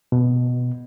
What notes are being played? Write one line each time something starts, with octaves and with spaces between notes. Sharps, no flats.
B2